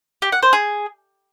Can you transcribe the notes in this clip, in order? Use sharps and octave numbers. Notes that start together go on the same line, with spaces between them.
G4
F#5
C5
G#4